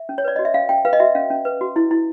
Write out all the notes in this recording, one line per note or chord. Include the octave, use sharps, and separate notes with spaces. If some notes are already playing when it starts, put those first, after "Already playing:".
Already playing: E5
C#4
C#5
B4 D5
F#4 D#5
E5
C#4 F5
C#4 G5
B4 F5
D#5
F#4 E5
C#4 F5
C#4
B4
F#4
E4
E4